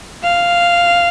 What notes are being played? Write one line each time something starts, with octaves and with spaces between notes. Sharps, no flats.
F5